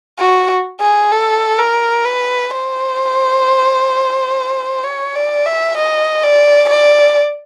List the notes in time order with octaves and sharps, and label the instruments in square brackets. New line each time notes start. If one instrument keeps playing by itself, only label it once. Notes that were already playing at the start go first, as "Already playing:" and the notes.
[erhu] F#4
G#4
A4
A#4
B4
C5
C#5
D5
E5
D#5
D5
D5